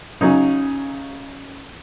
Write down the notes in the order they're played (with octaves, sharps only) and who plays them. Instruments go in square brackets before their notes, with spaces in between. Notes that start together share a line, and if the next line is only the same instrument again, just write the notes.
[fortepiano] C#3 F#3 D#4